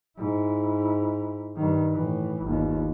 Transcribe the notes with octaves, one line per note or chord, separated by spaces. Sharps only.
G#2 E4
G2 D#3
A2 E3
G1 D#2